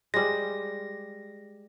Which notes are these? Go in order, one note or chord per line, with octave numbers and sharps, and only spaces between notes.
G3 G#3 A#6